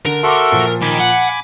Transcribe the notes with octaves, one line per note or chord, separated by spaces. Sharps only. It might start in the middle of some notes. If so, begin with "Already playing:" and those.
D3 A#4
F#4 A4 E5 C6 D6
A#2 F3
D#3 G#5 B5 D6
F#5